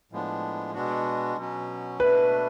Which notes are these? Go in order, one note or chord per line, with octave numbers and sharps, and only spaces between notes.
A2 F3 G#3 B3 D4
B2 G#3 B3 D4 F#4
B2 F#3 C#4
B2 A3 D4 B4